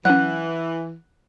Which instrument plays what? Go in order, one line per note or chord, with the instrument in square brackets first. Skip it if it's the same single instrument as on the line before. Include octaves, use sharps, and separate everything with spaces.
[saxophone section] E3 [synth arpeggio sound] F#3 C#4 [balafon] F#5 [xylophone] F#6